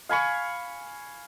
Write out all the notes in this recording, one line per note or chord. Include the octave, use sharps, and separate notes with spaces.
F5 G#5 B5 C#6